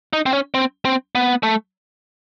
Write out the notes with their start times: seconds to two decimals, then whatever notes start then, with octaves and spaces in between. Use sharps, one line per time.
0.13 D#4
0.26 C4
0.33 C#4
0.54 C4
0.85 C4
1.15 B3
1.43 A3